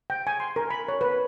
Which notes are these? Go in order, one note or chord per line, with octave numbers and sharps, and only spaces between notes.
G5
G#5
C6
A#4
B5
C#5
B4